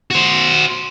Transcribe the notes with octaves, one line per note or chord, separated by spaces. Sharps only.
F#4 C5